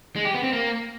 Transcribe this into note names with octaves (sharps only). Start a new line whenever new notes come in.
G#3
G4
B3
C4
A#3